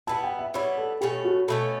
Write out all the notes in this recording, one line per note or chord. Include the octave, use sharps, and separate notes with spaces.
G3 B3 E4 A5
G5
E5
G3 B3 E4 C#5
A4
B2 A3 C#4 G4
F#4
B2 A3 C#4 A4